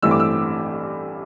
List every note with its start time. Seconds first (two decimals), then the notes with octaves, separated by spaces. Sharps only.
0.02 A1 G2 E3 A3 C4 E6
0.11 D6
0.20 E6